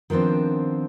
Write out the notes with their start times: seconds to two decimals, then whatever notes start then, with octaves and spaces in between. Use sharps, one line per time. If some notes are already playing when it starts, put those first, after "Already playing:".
0.10 D#3 F3 B3 C4 D4